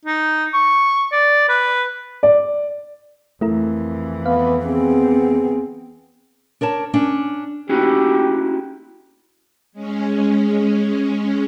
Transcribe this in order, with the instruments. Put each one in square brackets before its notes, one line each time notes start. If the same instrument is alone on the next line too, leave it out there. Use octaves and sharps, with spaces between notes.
[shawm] D#4
C#6
D5
B4
[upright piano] D5
[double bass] F2 E3 [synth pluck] A3 E4 A#4
[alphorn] B3 [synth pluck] F5
[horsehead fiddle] B3 C4 [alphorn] G#4
[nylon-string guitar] D4 A#4 C#5 A5
C#4 D4
[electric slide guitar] C#4 E4 F#4 [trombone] G4
[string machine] G#3 C#4